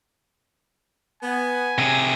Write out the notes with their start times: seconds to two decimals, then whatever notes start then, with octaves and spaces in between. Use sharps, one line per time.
1.23 B3 G#5
1.78 C3 G#4